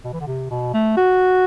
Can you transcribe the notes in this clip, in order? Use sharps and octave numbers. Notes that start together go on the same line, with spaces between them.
B2
E3
D3
C3
B2
A3
F#4